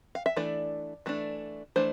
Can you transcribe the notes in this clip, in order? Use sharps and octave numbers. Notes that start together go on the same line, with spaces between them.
F5
E5
E3 A3 D4 D5
E3 A3 D4
E3 A3 D4 C5